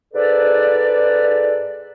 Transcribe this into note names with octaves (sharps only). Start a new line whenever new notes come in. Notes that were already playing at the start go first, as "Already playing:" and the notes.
G#2 A4 B4 D5